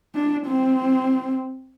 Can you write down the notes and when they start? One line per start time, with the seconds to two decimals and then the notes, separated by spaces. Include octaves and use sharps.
0.15 D4
0.46 C4